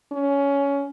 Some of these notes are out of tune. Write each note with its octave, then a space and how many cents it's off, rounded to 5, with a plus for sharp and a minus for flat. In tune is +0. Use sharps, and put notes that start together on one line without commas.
C#4 +15